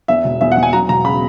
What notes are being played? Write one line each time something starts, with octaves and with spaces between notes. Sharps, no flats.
E2 E5
E1
E2 E5
F#5
E2
G#5
F#3 A#5
E1 A#5
C#3 B5